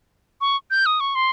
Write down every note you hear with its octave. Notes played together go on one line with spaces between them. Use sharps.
C#6
G6
D#6
C#6
C6